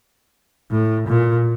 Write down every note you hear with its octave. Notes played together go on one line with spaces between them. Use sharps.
A2
A#2